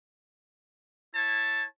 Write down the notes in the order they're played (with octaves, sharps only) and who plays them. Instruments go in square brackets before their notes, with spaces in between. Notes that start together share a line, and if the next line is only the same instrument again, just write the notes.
[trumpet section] E4 C#5 A5